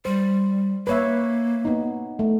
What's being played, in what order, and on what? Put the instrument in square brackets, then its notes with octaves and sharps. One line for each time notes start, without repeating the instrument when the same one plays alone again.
[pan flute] G3 [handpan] C5
[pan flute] A#3 [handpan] B4 C#5 E5
[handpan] B3 D#4
A3